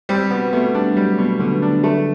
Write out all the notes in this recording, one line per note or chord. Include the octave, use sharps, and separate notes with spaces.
G3 C4
B2 B3
B2 A3
G3 D4
F#3 G3
B2
B2 D3
D4
A3